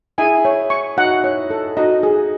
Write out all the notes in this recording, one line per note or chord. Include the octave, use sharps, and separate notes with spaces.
E4 G#4 G#5
C#5
C#6
D#4 F#4 F#5
C#5
A4
D#4 F#4 D#5
G#4